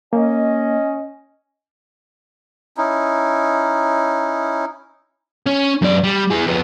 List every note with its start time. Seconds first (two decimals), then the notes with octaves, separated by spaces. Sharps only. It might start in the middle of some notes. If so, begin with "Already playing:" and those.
0.13 A#3 C#4 D#5
2.77 C#4 D#4 E4
5.46 C#4
5.82 F#2 D5
6.04 G3
6.31 E3 G#4
6.47 F2 B3